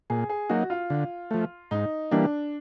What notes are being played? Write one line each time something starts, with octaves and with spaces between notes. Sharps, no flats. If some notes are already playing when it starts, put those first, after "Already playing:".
A#2 G#4
G#4
F#3 A#3 D#4 F#4
F4
D3
F3 A3
G#2 D#4
E3 G3 A#3 D4